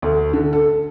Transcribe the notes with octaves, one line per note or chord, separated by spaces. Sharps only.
D2
D3
A4